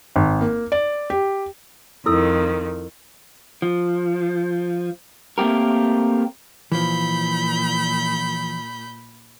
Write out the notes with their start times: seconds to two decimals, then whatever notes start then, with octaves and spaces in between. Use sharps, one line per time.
0.16 G#1
0.41 A#3
0.72 D5
1.10 G4
2.06 F2 D#3 E4 A4 E6
3.62 F3
5.38 A3 A#3 C4 G4 A#4
6.72 A#2 E3 F3 B5 G6